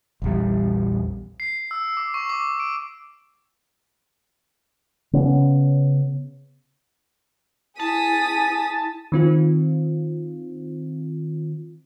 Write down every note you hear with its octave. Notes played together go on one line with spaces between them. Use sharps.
A#1 E2 G3
C7
E6
D6
C#6
D6
D7
C#3 B3 C#4
E4 G#4 A5 D#6 B6
D#3 C4 F4